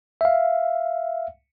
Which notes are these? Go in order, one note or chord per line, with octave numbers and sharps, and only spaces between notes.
E5 F5